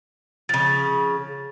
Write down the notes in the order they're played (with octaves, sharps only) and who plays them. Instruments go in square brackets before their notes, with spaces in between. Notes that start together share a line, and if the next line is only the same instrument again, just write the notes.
[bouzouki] C#3 F3 [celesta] A6